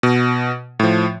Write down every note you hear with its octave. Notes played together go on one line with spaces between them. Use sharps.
B2
A2 F3